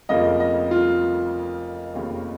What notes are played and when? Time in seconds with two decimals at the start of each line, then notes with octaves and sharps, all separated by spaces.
0.09 F1 F2 C#3 F3 A#3 D#5
0.40 D#5
0.71 F4
1.94 F1 D#2 C#3